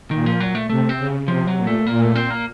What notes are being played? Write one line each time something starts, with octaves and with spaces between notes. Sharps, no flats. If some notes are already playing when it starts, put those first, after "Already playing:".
A#2 D#3
F3
F#3
A3
C3 A3
C4
C#3
C3 F3
F#3
A#2
A3
A#2 A#3
A3
C4
A#3